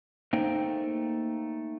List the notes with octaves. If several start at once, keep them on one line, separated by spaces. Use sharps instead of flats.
A3 A#3 D#4 C5 G5